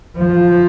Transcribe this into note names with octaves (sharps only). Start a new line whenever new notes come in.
F3